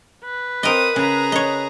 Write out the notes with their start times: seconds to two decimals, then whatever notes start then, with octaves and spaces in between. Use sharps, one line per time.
0.24 B4
0.63 C4 A#4 D#5 D#6
0.96 C#3 G#4 A#5
1.32 C#5 D#5